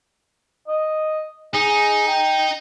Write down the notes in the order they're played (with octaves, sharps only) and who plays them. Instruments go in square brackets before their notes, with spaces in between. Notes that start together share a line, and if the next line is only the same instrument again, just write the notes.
[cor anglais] D#5
[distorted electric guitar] D#4 [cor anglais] G#4
[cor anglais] G5